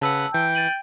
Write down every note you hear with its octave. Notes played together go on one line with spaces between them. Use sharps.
C#3 B4 F#5 A5 E6
E3 G5
A6 D#7 F#7